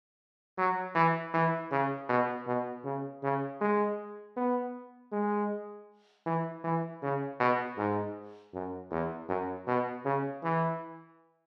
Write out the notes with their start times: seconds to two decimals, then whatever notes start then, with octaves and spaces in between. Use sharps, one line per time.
0.58 F#3
0.95 E3
1.34 E3
1.72 C#3
2.09 B2
2.47 B2
2.85 C#3
3.23 C#3
3.61 G#3
4.37 B3
5.12 G#3
6.26 E3
6.64 E3
7.03 C#3
7.40 B2
7.78 G#2
8.54 F#2
8.91 E2
9.29 F#2
9.67 B2
10.05 C#3
10.44 E3